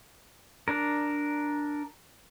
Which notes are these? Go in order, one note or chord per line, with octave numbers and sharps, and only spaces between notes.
D4 A#4